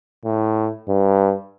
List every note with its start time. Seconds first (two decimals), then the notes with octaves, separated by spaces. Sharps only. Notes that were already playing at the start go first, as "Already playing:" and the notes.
0.25 A2
0.88 G2